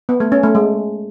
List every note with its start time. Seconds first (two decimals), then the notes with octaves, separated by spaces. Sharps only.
0.09 B3
0.20 A3
0.32 C#4
0.43 A3
0.55 G#3